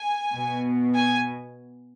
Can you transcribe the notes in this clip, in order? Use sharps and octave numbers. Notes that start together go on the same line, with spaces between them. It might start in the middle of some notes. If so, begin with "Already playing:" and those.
Already playing: G#5
B2
G#5